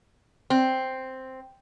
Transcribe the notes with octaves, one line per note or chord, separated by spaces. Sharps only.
C4